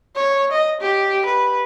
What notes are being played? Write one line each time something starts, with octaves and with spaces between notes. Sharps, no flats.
C#5
D#5
G4
B4